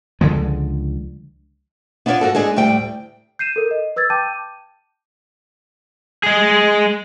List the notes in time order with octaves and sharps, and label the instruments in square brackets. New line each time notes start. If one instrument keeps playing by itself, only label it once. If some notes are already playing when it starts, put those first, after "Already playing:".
[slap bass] C#2 D3 F3 G#3
[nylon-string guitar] B3 D4 E4 F4 C#5 D5
G#2 F#4 A4
G#3 D4 G#4 A4
D2 A2 G3 G5
[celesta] G6 C7 D#7 E7
A4 A#4
D#5
B4 E6 G#6 A6
G5 A5 D6 G6 D#7
[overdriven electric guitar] G#3 G#4